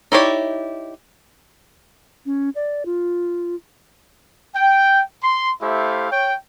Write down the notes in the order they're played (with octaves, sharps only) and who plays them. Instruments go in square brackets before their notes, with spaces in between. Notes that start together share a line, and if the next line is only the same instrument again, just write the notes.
[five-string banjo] D#4 E4 G4 C#5 D5
[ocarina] C#4
D5
F4
[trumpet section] G5
C6
A3 E4 G4 C5 F5
C#5 G5